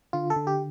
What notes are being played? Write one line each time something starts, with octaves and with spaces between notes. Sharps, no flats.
D3 F4
A4
D3
G4